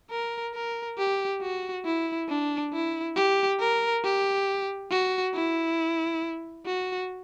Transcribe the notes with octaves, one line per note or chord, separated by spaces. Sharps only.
A#4
A#4
G4
F#4
E4
D4
E4
G4
A#4
G4
F#4
E4
F#4